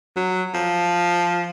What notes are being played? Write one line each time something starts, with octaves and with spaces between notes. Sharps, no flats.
F#3
F3